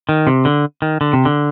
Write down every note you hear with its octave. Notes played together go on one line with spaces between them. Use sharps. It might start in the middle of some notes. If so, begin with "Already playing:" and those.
D#3
C3
D3
D#3
D3
C3
D3